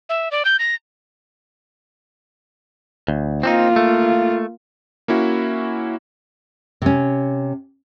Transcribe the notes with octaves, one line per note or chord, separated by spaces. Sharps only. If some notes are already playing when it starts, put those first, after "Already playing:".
E5
D5
G6
A#6
D2
A#3 C4 D4 D#4 F4
A3
A#3 C#4 E4 F#4
C3 C#4